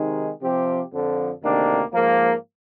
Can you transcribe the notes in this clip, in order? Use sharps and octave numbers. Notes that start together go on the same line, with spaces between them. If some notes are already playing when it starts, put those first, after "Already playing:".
Already playing: C3 D#3 G#3 D#4 G#4
C3 F3 C4 G4
F2 D3 F3
D2 C3 D#3 A#3 D4
G#2 F3 A#3